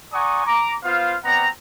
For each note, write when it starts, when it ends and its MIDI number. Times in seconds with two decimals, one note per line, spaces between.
0.13 0.44 74
0.13 0.44 78
0.13 0.44 80
0.13 0.44 82
0.13 0.44 85
0.13 0.44 87
0.45 0.73 82
0.45 0.73 86
0.84 1.15 59
0.84 1.15 65
0.84 1.15 72
0.84 1.15 77
1.25 1.46 59
1.25 1.46 60
1.25 1.46 74
1.25 1.46 78
1.25 1.46 82